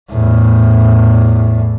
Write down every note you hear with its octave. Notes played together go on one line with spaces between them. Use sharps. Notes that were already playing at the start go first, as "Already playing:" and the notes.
E2 A2